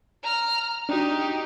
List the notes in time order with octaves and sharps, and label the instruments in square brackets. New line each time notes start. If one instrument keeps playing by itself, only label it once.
[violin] A#5 F6
[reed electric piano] D4 F#4 [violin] D#4 G4